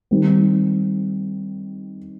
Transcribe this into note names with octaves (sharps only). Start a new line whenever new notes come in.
D#3 G3 C4